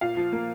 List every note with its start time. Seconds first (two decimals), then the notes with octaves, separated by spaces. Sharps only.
0.01 A#2 F5
0.17 F3
0.33 A#3